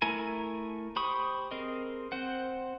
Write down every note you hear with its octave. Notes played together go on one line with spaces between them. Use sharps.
A3 E4 A#4 G#5
G4 C5 B5 C#6 D#6
C4 G#4 A#4 D#5
C4 C5 F#5